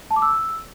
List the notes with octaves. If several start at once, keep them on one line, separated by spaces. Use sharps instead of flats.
A5
D6
E6